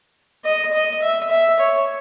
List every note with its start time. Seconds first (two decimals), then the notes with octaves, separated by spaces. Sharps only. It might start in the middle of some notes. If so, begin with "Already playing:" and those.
0.44 D#5
0.73 D#5
1.02 E5
1.31 E5
1.59 C#5